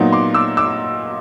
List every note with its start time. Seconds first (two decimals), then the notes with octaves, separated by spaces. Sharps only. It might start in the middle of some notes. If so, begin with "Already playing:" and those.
Already playing: A#2 F#3 B3 D#4
0.12 C6 D6
0.34 D6 E6
0.57 D6 E6